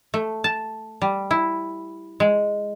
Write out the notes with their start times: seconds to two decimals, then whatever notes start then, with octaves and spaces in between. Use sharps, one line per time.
0.14 A3
0.44 A5
1.02 G3
1.31 E4
2.20 G#3